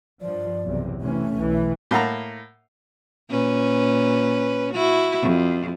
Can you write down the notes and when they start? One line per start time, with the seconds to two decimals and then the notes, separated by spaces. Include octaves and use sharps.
0.21 G2 F3 D5
0.64 B1 E2 C3
1.01 C3 E3 A3 C#4
1.36 B1 E3
1.91 A2 A#3 F#5 A5 A#5
3.30 A#2 C#4 B4
4.73 E4 F#4
5.22 F2